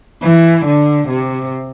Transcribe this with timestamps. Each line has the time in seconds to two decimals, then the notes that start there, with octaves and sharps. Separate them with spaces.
0.22 E3
0.66 D3
1.08 C3